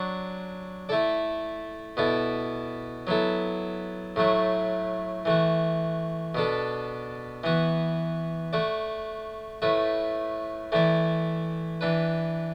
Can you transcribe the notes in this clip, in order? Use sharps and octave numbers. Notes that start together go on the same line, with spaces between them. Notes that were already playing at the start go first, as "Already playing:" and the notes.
Already playing: F#3 D4 F#4
A3 E4 A4 D5
B2 B3 E4 A4 D5
F#3 B3 E4 A4
A2 F#3 A3 F#4
E3 A3 F#4
B2 B3 D4 A4
E3 B3 F#4
A3 F#4 D5
A2 A3 F#4 B4
E3 A3 E4 D5
E3 D4 B4